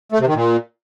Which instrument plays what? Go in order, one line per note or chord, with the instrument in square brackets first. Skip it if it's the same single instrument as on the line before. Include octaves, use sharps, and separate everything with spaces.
[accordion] A3
C3
D#3
A#2